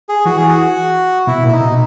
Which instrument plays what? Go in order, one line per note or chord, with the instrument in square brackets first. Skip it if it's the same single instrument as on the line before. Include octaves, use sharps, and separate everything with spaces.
[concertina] G#4
[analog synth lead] E3 [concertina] F#4
[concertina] G#4
F#4
[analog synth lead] B2 [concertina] E4
[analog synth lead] A#2
[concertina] E4
D#4
[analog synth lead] B2